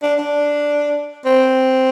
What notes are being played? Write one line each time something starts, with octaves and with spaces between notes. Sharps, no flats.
D4
D4
C4